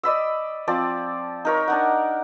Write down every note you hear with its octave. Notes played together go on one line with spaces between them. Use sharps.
D5 D#5 B5 E6
F3 C4 D5
D#4 A#4 C#5
D4 D#4 F#5